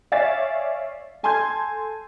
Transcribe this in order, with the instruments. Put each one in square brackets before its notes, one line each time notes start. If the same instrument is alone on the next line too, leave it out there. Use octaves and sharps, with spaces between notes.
[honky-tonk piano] C#5 D5 E5 F5 G#5 A6
A4 G#5 A5 C6 G6 G#6